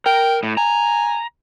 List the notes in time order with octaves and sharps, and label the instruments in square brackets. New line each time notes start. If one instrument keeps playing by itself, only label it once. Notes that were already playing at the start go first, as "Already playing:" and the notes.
[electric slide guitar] A#4 [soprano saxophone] G5
[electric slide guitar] A2
[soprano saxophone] G#5 [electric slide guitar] A#5